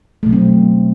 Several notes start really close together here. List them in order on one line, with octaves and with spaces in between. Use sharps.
A3 B2 F#3 C4